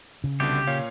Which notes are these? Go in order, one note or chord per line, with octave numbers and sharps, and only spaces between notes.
C#3
C2 B2 D3 G4
A#2 C#5 F5